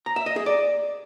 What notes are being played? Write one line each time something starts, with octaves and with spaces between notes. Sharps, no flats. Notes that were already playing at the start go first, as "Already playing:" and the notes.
A#5
E5
D#5
G#4
D5